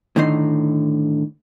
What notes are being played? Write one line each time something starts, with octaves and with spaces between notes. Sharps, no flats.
A2 D3 D#3 D#4 C6